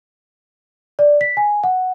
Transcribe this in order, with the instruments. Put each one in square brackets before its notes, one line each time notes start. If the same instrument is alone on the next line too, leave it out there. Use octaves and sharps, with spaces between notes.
[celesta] D5
B6
G#5
F#5